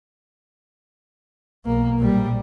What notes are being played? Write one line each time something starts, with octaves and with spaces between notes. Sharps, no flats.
B1 A#3
A#1 G3